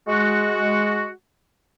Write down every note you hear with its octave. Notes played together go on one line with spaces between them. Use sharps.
G#3 F#4